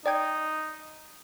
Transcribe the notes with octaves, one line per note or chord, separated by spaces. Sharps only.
D#4 D5 G5 G#6